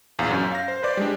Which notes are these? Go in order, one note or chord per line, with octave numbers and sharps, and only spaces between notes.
A#1 E2 F5 G6
F#2 C#4
F5 A#6
C5
B4 C5 D5 D6
G3 G#3 D4